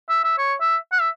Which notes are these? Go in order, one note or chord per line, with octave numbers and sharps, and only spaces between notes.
E5
E5
C#5
E5
F#5
E5